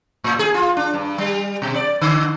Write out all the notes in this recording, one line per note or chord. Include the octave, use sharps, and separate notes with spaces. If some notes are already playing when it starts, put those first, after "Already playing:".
A2
G#4
F4
D4
G2
G3
B2
D5
D3